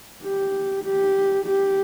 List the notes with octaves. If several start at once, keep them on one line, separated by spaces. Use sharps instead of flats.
G4
G4
G4